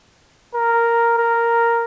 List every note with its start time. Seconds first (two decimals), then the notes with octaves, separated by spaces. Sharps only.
0.54 A#4
1.18 A#4